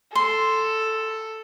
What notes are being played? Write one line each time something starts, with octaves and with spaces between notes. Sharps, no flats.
A4 C6